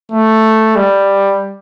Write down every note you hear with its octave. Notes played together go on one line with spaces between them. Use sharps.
A3
G3